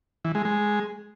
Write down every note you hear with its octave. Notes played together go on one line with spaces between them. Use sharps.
E3
G#3
G#3